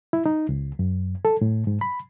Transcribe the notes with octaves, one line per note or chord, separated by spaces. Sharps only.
E4
D#4
C#2
F#2
A4
A2
G#2
B5